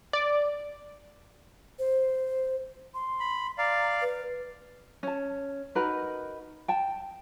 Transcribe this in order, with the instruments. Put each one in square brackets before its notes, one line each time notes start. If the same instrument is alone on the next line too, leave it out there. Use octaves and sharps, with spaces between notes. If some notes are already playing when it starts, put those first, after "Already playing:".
[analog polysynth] D5
[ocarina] C5
C6
[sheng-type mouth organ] B5
[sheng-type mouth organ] D5 F5 [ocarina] A#5
[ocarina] B4
[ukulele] C#4 A5
D#4 F#4 A#4 B4
G5 A5